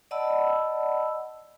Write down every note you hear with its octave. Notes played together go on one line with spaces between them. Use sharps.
D5 D#5 F#5 A5 B5 E6